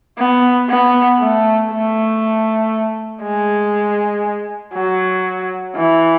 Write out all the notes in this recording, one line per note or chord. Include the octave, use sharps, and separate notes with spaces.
B3
B3
A3
A3
G#3
F#3
E3